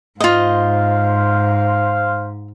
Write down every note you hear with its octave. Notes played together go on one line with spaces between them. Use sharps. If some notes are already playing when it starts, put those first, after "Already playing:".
G#2 F4 C5 D#5 F5